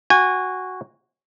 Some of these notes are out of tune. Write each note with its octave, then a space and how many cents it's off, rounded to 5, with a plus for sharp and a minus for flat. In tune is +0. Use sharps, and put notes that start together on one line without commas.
F#4 +0 G#5 -25